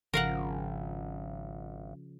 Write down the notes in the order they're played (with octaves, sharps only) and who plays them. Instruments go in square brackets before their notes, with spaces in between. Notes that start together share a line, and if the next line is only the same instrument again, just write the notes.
[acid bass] G#1 [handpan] C#3 F3 [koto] A#4 F5 F#5